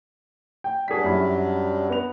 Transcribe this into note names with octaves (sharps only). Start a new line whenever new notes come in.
G5
F#3 G3 D4 G#4 B6
F#2 E4 B5
B3 F7